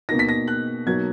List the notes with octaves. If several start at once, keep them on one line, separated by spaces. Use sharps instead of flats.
B2 A#3 D#4 A#6
B6
A#6
F#6
B2 F#3 A#3 D#4 G#6